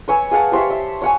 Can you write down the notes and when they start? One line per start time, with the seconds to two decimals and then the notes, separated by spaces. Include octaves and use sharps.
0.08 B4 C#5 G#5 E6
0.31 G#4 F5 F#5 A5
0.52 G4 C5 C#5 E5
0.70 E5
1.02 C#5 F#5 G#5